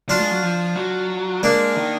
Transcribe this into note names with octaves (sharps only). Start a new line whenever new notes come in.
F#3 D4 F4
G#3
F#3
F3
F#3
G#3 A#3 D4
D#3